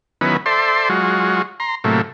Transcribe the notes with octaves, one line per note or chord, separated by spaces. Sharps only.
D#3 F#3 B3 C#4 E4 B4
A4 C5 D5 E5 C6
F#3 G#3 F4 F#4
A#5 C6
A2 C3 F#3 A3 A#3